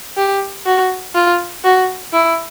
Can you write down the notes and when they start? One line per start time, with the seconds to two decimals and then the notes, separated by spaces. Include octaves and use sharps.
0.17 G4
0.66 F#4
1.15 F4
1.64 F#4
2.13 E4